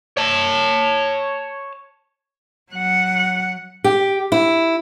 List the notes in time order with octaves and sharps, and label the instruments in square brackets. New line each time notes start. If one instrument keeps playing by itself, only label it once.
[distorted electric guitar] C#5 A5
[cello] F#3 F#5
[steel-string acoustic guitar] G4
E4